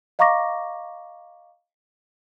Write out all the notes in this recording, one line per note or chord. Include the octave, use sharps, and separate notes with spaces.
D#5 F5 A#5 C#6 D6 A#6